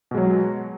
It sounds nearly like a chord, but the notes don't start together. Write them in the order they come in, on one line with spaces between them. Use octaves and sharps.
B2 G#3 F#3